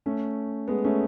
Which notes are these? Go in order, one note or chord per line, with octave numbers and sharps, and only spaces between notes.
A3 C#4
G#3 B3
A3 C#4